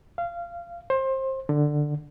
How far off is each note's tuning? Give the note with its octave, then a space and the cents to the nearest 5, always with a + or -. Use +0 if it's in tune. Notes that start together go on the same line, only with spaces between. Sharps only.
F5 -20
C5 +25
D3 +10